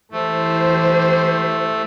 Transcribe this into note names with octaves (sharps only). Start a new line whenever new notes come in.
E3 A3 G4 C5